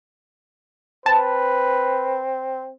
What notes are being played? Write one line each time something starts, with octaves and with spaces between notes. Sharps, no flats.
C4 B4 A5